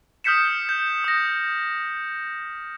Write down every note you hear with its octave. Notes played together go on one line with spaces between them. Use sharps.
D#6 F6 G6 B6 C#7 E7
G6
D#6 A#6